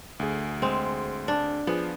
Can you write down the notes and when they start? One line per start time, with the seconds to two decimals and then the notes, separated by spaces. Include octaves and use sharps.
0.20 D2 G#4
0.62 G#3 C4
1.28 D4
1.67 F3 B3 G#4